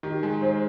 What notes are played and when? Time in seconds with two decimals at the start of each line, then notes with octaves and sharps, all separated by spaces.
0.03 D#3 G4
0.22 G#3 G#4
0.41 G#2 C5